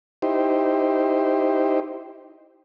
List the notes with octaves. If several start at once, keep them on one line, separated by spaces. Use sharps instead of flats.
D#4 E4 G4 C5